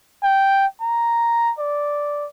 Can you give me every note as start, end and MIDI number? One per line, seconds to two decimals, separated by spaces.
0.23 0.66 79
0.81 1.52 82
1.59 2.26 74